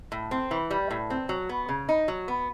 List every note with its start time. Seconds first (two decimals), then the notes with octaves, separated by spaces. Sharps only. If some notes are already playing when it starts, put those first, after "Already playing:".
0.12 A2
0.31 C4
0.51 E3
0.71 G3
0.91 A2
1.10 C4
1.29 F#3
1.49 B3
1.69 C#3
1.89 D#4
2.08 F#3
2.28 B3